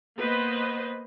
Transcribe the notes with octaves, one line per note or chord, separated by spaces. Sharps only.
A#3 B3 B4 C5 D#5